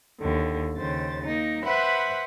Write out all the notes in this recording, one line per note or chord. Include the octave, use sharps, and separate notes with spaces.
D#2 D3
D#2 C#3 C5 A6
A#3 D#4
B4 C5 E5 F#5 B5